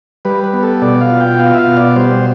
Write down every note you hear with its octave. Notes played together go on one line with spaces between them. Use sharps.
G3 B4
B4
B3
A4
B2 D5
F5
F4
G5
B3 F5
E5
F5
B2
D5
G3 C5